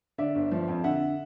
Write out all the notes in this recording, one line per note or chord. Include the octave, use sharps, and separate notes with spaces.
D3 D5 E5
G1
F3
F2
D3 E5 F#5